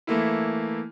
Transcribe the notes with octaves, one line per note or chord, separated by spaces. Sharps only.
E3 A3 A#3 E4